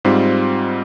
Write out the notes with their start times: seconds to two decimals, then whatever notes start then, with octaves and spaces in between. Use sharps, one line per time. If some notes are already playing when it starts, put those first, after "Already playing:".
0.05 G#2 G3 C4 F4